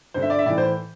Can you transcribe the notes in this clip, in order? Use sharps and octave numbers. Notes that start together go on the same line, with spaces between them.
G2 D3 C5
E5
D5
E5
A2 E3 D5
C5